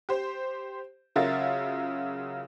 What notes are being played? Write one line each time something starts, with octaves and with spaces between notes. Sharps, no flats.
G4 C5
C#3 F#3 F4 A#4 E5 A6